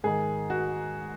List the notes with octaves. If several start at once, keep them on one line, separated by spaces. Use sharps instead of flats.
G#2 D#3 G#4
F#4